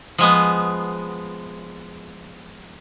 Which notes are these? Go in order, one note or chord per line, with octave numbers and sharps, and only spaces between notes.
F3 G#3 B3